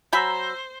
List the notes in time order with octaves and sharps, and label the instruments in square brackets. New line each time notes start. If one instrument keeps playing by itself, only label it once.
[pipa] F#3 G#5 B5 [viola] C5 [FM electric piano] A#5 E6 G6